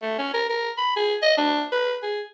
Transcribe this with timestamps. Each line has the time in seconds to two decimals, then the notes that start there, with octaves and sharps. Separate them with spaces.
0.02 A3
0.18 C#4
0.34 A#4
0.49 A#4
0.77 B5
0.96 G#4
1.22 D#5
1.37 D4
1.72 B4
2.03 G#4